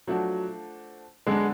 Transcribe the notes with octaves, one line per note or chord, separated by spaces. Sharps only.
F3 F#3 A3 D4 F#4
D3 F#3 G#3 B3 D4